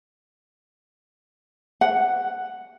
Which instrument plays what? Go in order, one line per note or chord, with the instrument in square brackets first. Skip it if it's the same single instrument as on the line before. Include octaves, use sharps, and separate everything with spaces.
[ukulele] F#5